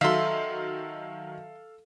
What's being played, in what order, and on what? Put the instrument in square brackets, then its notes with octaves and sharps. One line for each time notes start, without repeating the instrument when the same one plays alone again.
[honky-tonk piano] D#3 F#3 [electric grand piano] A4 F5 [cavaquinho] E5 C6